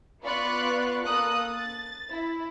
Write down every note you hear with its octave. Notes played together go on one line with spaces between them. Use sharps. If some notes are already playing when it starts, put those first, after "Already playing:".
B3 F4 D5 B5 C#6 F#6
A#3 A4 D#6 F#6
A6
E4